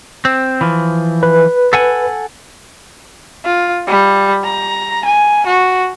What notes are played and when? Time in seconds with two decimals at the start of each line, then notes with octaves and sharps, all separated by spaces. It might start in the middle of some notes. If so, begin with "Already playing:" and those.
0.25 C4
0.61 E3 F3
1.23 B4
1.73 A4 F#5 G#5
3.44 F4
3.87 G3
4.43 A#5
5.05 G#5
5.46 F#4